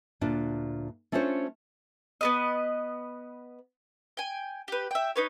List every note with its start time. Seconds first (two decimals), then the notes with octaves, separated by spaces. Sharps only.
0.21 D2 A#2 D4
1.12 A3 C#4 D4 F4 C5 C#5
2.21 B3 B4 D#5
4.17 G5 G#5
4.68 G4 B4
4.91 E5 G5
5.16 D#4 B4 C#5